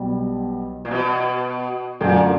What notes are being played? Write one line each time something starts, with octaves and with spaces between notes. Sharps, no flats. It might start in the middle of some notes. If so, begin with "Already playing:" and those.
Already playing: B1 B2 G3
A#2
B2
F#2 A#2 D3 F#3 A3